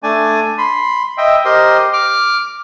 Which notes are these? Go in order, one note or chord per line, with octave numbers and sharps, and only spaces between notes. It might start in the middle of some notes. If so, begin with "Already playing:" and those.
A3 D4 D5 G#5
B5 C6
D#5 E5 G5
G4 A#4 C5 D#5 C6
D6 F6